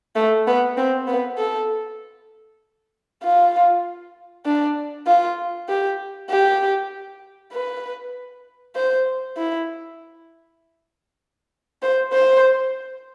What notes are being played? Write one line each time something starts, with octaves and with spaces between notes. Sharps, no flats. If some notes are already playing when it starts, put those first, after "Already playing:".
A3
B3
C4
B3
A4
F4
D4
F4
G4
G4
B4
C5
E4
C5
C5